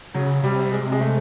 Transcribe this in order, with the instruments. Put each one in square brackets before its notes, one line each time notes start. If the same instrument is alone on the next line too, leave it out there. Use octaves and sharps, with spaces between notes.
[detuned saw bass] C#3 [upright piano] F#3
[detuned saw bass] C3 [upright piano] G3
[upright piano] G#3
G#3
A3